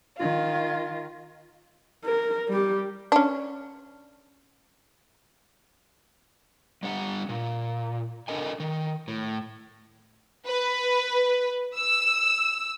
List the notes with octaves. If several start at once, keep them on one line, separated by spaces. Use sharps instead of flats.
D#3 F4
A#4
G3 G4
C#4 D4
G3 D4 F#5
A#2
D4 A4 A#4 D#5 G#5
D#3
A2
B4
E6